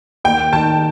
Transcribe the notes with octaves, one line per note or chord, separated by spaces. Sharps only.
D#2 G5
D#3 A5